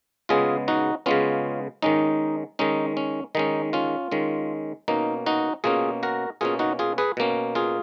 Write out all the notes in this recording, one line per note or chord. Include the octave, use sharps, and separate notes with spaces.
C#3 G#3 B3 F4 G#4
D#4 F#4
C#3 G#3 B3 C#4 F4
D#3 G#3 C#4 D#4
D#3 G#3 C#4 D#4
C#4
D#3 G#3 C#4 D#4
C#4 F4
D#3 G#3 C#4
B2 A#3 C#4 D#4
D#4 F#4
B2 A#3 C#4 F4 G#4
F#4 A#4
B2 A#3 C#4 F4 G#4
D#4 F#4
F4 G#4
G#4 B4
B2 A#3 C#4
F4 G#4